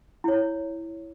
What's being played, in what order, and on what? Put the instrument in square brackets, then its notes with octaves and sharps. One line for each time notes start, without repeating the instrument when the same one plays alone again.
[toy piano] E4 C#5